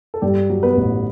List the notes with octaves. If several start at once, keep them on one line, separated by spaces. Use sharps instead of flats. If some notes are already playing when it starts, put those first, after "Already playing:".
A4
G2 G3 G4
F#3
B3 B4
A1